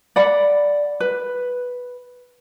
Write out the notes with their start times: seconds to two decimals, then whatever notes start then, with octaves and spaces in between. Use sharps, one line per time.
0.16 D5 F#5 B5
1.00 B4